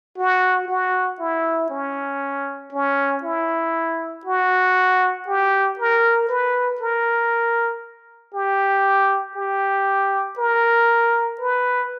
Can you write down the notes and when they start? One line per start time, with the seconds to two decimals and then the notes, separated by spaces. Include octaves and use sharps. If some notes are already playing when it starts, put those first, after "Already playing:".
0.18 F#4
0.68 F#4
1.20 E4
1.70 C#4
2.73 C#4
3.24 E4
4.26 F#4
5.28 G4
5.79 A#4
6.29 B4
6.81 A#4
8.34 G4
9.36 G4
10.38 A#4
11.40 B4